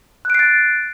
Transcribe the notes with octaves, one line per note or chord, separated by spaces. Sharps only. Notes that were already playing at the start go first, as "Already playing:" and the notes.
F#6 A6 C7 D7